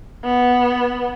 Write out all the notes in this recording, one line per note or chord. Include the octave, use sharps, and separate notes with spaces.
B3